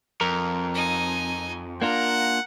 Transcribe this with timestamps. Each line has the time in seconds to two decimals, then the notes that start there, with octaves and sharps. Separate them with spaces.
0.21 F2 A#4
0.74 D#4 G#5
1.82 A#3 D4 F4 A#4 F#5 A#5